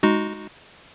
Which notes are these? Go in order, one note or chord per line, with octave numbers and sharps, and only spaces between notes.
G#3 D#4 F#4